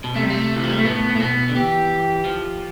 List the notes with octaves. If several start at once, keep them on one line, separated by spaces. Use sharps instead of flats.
B2
C3 A3
G3
A3
E3
F3
G3
A3
A2 B3
A2
A3
B2 B3
D3
E3 G4
F3